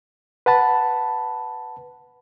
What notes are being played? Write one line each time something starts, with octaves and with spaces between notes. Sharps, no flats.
B4 F#5 A5 B5